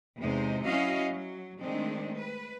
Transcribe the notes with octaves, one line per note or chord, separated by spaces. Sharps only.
E2 C3 G#3 D#4 C5
F#3 C#4 E4 F#4 D#5 F5
F#3
D#3 G#3 A3 C4 D4
B4